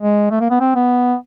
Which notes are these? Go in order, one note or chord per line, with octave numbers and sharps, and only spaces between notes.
G#3
A3
A#3
B3
C4
B3